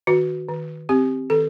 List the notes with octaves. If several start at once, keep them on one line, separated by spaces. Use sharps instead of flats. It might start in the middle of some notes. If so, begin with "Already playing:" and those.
D#3 F#4
D#3
C4 G4
D#3 A4